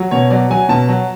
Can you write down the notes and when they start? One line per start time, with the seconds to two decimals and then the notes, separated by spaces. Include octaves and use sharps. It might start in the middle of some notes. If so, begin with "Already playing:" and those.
Already playing: F#3
0.11 B2 C#5
0.30 F#3 D5
0.50 F#3 G#5
0.69 B2 A5
0.88 F#3